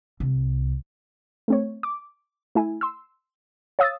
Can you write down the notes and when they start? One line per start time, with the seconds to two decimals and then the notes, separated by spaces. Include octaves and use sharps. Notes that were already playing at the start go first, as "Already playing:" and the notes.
0.20 C2
1.48 A3 C4 C#5
1.83 D6
2.55 A3 E4 G#5
2.81 C6 E6
3.79 C#5 F5 D#6 E6 A6